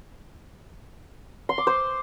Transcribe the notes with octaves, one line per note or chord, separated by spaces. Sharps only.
C6
D6
C5